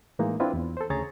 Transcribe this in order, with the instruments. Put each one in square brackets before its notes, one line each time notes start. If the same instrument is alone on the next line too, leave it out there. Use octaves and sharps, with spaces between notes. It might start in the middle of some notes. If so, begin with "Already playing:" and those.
[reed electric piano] A2 E3 G#3 A#3 D#4
C4 D4 E4 F4 B4
E2
A4 C5
D2 C#3 G#4 C#5 A#5 A6